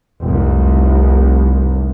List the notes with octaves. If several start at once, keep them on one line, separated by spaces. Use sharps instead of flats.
F1 C2